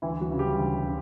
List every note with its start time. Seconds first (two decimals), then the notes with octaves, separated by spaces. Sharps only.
0.02 D2 E3 E4
0.21 F#3 F#4
0.30 C#3 E3
0.39 G3 G4
0.58 D2
0.86 C#3